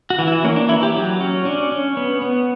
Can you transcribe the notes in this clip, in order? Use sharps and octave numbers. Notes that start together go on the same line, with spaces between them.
F#4
E3
E4
A#3 C#4
D4
E3 E4
G4
F#3
C#4
C#4 D4
C#4
B3
B3